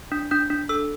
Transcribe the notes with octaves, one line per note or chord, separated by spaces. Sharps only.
D4
D4 G6
D4
A4 E6